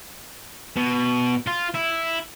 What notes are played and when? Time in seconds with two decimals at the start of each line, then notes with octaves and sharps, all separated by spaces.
0.77 B2
1.47 F4
1.74 E4